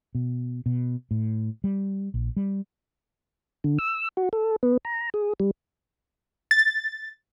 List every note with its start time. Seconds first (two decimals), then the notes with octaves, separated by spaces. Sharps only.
0.15 B2
0.66 B2
1.11 A2
1.64 G3
2.14 A#1
2.36 G3
3.64 D3
3.79 E6
4.17 F#4
4.33 A4
4.63 B3
4.85 A#5
5.14 G#4
5.40 G3
6.51 A6